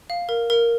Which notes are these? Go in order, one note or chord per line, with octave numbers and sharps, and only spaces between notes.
F5
A#4
A#4